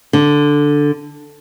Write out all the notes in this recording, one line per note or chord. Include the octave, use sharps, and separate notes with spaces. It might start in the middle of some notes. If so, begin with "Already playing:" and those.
D3